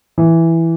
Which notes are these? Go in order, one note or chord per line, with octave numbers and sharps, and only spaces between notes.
E3